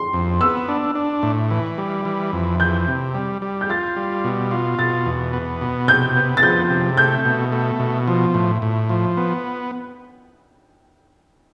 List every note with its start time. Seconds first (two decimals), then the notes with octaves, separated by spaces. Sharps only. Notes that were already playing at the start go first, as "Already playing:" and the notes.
Already playing: C6
0.13 F2
0.41 B3 E6
0.68 D4
0.95 D4
1.23 A2
1.51 E3
1.78 G3
2.05 E3
2.33 F2
2.60 E3 G6
2.88 C3
3.14 G3
3.42 G3
3.61 G6
3.69 F4 A6
3.97 G3
4.24 B2
4.51 F4
4.79 B2 A6
5.06 E2
5.33 B3
5.61 B2
5.88 C3 G6
6.16 B3
6.37 A6
6.43 F3 G6
6.70 C3
6.97 A3 G6
7.25 B2
7.52 A3
7.80 B2
8.08 F3
8.34 A2
8.62 A2
8.89 F3
9.17 B3